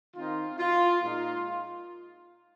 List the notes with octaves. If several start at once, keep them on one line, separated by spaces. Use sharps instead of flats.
D#3 C4 D#4 F4
F4
A#2 G#3 D#4 F4